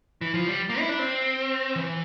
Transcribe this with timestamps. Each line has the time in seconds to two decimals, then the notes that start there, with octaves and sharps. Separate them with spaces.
0.21 E3
0.34 F3
0.47 G3
0.69 A#3
0.79 E4
0.89 D4
0.99 C4
1.76 E3